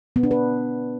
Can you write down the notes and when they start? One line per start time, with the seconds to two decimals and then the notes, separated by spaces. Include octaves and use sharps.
0.16 B3
0.23 D4
0.31 B4